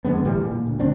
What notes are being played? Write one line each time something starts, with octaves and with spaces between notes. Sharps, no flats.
F2 D3 G#3 B3
A2 E3 G3
A#2
D2
C#2 G#2 C4 D4